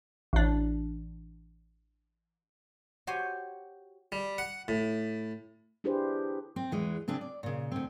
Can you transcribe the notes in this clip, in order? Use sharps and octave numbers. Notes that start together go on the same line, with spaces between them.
A1 D4
F#4 G4 C5 C#5 G#5
G3
F#5
A2
D4 E4 G4 G#4 B4 C5
C4
E2 E3 G#3
C#3 C4 D4 G#4
D5
A#2 C#3
D2 C4